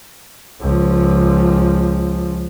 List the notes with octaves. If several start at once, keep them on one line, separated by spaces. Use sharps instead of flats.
C#2 F3